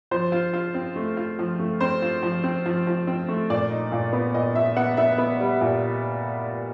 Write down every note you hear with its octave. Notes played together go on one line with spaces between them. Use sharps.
F3 C5
F4
F4
C4
A3
F4
F3
A3
C4 C5
F4
F3
C4
F3
F3
C4
A3
A#2 D5
D#4
A#2
B3
A#2 D#5
A#2 E5
B3 F#5
B3 E5
B3
G3
A#2